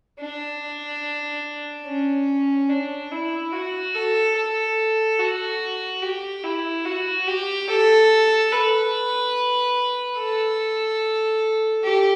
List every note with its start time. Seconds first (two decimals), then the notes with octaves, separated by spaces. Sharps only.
0.20 D4
1.86 C#4
2.69 D4
3.11 E4
3.53 F#4
3.95 A4
4.36 A4
5.19 F#4
6.02 G4
6.44 E4
6.85 F#4
7.27 G4
7.68 A4
8.52 B4
10.18 A4
11.84 G4